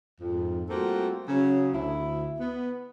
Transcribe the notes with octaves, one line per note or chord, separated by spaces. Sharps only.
F2 G#2
G3 A3 A#3 C4 F4 F#4
C#3 F#3 C#4
D2 E4
B3